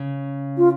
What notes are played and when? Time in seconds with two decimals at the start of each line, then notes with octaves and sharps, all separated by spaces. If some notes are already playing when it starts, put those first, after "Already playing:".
Already playing: C#3
0.58 F4